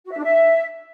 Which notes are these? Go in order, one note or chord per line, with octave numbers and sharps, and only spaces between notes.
F#4
E5
D4
E5